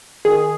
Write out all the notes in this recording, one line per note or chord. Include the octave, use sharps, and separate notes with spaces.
D#3 G#4